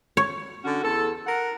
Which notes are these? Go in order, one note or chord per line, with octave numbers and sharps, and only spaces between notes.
C#5
D3 C#4 F#4
E2 A4
A#4 F#5